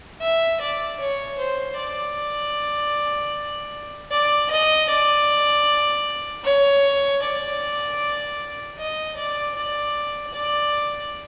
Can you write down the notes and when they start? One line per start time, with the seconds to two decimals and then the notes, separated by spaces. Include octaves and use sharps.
0.22 E5
0.61 D5
1.00 C#5
1.38 C5
1.77 D5
4.11 D5
4.51 D#5
4.89 D5
6.44 C#5
7.23 D5
8.79 D#5
9.17 D5
9.56 D5
10.34 D5